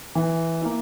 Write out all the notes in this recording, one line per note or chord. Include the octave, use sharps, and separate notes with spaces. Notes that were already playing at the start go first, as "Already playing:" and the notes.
E3
A#3 E4